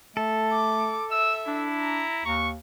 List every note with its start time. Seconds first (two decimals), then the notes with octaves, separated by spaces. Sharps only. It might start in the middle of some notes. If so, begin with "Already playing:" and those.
0.17 A3 A4
0.52 D6
1.11 E5 E6
1.47 D4 E4
1.80 A#5
2.25 D#2 C#6